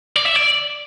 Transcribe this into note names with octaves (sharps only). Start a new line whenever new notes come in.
D5
E5
D5